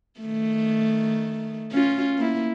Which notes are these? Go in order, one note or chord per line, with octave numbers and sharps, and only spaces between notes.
D#3 A3
C#4 F4
A#3 E4